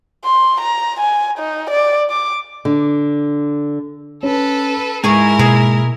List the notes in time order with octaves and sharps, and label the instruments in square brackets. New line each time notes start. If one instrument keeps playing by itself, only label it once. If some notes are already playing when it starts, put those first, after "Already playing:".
[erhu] C6
A#5
G#5
D#4
D5
D6
[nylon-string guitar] D3
[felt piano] C#4 [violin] A4 B4
[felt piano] G#2 [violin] E4 A#4 [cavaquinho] G#4 G#5 C#6
[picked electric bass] B2 A#3 [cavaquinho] G#4